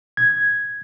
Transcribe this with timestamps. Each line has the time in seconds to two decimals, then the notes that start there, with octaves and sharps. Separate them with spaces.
0.17 G#6